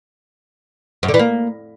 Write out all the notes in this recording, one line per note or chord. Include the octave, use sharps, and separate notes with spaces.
F#2
D3
E3
A#3